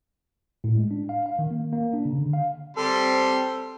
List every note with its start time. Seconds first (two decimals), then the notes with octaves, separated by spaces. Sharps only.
0.64 A2
0.76 G#3
0.91 D4
1.09 F5
1.26 F5
1.39 D#3
1.51 A#3
1.73 A#3
1.93 D4
2.05 C#3
2.18 D3
2.33 F5
2.77 G3 C4 A4 C6